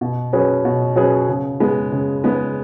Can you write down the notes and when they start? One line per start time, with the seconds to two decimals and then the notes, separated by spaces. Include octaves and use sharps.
0.01 B2
0.33 F#3 C#4 G#4 B4
0.65 B2
0.96 F#3 C#4 G#4 B4
1.28 C#3
1.60 G#3 B3
1.92 C#3
2.24 G#3 B3